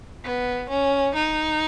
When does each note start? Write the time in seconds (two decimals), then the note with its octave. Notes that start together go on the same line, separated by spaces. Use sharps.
0.24 B3
0.70 C#4
1.15 D#4